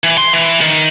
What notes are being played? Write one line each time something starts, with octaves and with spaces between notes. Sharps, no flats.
E3
C6
E3
D#3